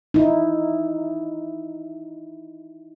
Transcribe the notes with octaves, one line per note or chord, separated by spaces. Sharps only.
D#4 E4